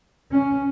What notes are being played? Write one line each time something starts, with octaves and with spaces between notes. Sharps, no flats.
C#4